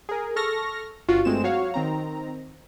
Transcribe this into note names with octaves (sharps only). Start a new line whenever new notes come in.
G#4 A#4
A4 C#6 F6 A#6
G1 G2 F4 F#4
G2 G#3 A3 C4 E7
F#3 F#4 C#5 F5
D#3 C4 A#5